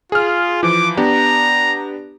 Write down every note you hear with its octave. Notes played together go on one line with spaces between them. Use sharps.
F4 G#4 F6
E3 F3 D6
B3 D4 G4 A#5